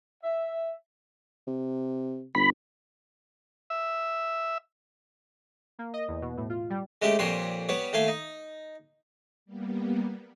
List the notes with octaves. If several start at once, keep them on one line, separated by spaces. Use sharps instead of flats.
E5
C3
G1 B5
E5
A#3
D#5
E2
B2
A2
F4
G3
G#3 A3 C#4 G4
F2 A#2 G3 C#5 C6
G3 B3 C#5
D#2 A3 F5 G#5
D#4
G3 A#3 B3